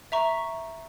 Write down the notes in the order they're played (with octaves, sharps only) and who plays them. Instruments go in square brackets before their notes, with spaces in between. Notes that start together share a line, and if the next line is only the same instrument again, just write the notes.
[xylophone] E5 A#5 C#6